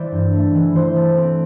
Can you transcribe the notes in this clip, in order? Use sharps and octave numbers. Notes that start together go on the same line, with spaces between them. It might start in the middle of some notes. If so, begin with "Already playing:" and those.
Already playing: E3 C5 D5 E5
G2
A3
E3
E3 C5
A3
C4